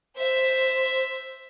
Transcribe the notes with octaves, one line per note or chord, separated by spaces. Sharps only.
C5 E5